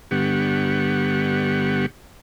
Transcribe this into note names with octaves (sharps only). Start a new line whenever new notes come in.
G2 D3 B3 G4 F#5 C#6